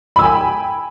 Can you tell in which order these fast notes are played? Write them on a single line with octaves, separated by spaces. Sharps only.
B5 E6 G#5 G5